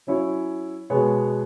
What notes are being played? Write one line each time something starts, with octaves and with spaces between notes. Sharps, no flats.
F#3 C#4 E4 C#5
B2 G#3 B3 G#4 C#5